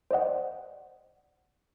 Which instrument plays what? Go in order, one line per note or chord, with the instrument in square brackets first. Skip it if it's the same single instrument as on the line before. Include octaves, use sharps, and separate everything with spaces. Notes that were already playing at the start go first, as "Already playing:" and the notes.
[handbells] C5 D5 D#5 F#5